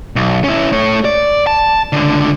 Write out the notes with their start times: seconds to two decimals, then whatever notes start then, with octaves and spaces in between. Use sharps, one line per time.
0.16 B1
0.44 C#4 E4
0.73 A3 C#5
1.05 D5
1.47 A5
1.93 C#2 D3